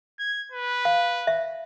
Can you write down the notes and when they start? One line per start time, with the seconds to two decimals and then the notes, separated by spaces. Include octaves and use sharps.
0.19 G#6
0.52 B4
0.85 F5
1.27 E5